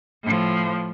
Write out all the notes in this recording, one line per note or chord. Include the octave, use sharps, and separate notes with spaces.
A2 F3